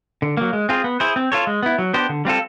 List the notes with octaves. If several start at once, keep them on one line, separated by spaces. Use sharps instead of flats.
D3
F#3 A#3
G#3
C4 F4 G#4
B3
E4 G#4 C5
C4
F4 A4 C#5
G#3
B3 E4
F#3
B3 D4 G4 C5
D3
G3 C4 F4 A4